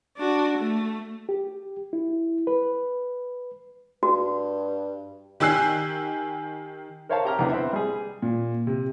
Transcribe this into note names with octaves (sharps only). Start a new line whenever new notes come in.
D4 F#4
A3
G4
E4
B4
G2 F#4
D#3 G4 G#5 E6 F#6 C7
A#4 C5 C#5 E5 F5 A5
G4 A#5 F6
E2 D3 B3
C4 B4 E5
G3 G#4
A#2
C3